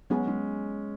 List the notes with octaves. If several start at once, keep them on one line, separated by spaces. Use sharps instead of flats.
F#3 G#3 B3 C#4 G#4
G#3 C#4